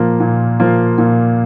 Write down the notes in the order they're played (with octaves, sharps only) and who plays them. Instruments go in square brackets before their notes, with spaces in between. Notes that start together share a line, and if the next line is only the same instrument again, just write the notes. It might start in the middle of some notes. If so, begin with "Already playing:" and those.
Already playing: [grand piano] A#2 F3 A#3 F4
A#2
F3 A#3 F4
A#2